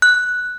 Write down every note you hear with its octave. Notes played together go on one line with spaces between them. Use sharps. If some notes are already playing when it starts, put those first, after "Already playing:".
F#6